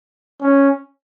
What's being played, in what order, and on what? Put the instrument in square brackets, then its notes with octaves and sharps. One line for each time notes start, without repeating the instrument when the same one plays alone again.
[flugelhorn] C#4